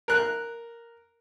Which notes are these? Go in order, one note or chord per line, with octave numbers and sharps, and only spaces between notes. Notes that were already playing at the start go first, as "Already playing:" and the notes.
A#4 F#6